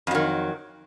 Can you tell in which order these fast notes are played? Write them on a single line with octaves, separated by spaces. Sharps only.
F2 F#3 D#3